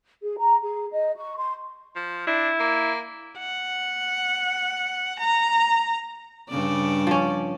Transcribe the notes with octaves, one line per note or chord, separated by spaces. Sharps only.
G#4
A#5
G#4
D#5
C#6
C6
F3
D4 E4
A#3
F#5
A#5
G2 C#3 D5
F3 C#4